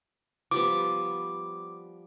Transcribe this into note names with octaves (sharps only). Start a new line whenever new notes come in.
F3 G3 B3 D6